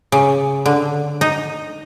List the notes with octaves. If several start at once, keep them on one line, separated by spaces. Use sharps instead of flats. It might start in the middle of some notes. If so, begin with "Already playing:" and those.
C#3
D3
D#4